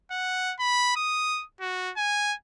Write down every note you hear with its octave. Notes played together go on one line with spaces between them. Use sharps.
F#5
B5
D#6
F#4
G#5